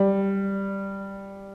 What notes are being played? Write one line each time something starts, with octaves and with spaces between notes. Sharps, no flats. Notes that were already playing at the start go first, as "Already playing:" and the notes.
Already playing: G3